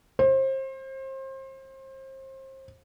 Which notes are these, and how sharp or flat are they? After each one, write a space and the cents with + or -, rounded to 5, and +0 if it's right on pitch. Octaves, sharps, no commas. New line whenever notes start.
C5 +30